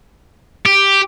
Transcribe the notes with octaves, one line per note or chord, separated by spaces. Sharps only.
G4